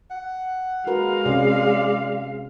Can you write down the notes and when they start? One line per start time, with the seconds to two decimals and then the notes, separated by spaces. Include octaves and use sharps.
0.11 F#5
0.87 G#3 F#4 A#4 B4 F5
1.26 C3 C#4 G#4 D5